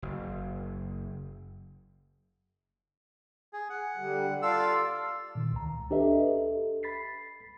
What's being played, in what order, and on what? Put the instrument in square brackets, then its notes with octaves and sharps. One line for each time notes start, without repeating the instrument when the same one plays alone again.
[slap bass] F#1
[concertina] G#4
F#5
[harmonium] D3 G3
[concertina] F4 A4 E6 [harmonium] D5 F5
[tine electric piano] A#2 D#3
C#2 A#5
D4 G4 A4 B4 D#5 E5
A4
B5 A6 B6 C7